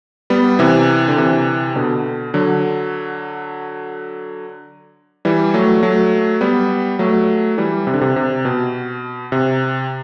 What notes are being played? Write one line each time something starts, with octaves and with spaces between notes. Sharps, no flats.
G3 B3
C3 E3
D3
C3 E3
B2 D3
D3 F#3
E3 G3
F#3 A3
F#3 A3
G3 B3
F#3 A3
E3 G3
C3
D3
C3
C3
B2
C3